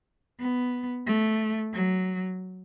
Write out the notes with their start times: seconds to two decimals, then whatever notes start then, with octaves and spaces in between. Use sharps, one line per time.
0.40 B3
1.06 A3
1.72 F#3